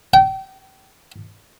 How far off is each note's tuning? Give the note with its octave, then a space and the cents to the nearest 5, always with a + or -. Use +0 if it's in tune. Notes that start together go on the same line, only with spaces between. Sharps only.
G5 -30